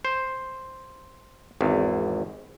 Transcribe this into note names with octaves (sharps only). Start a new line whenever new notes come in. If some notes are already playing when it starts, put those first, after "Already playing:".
C5
G#1 E2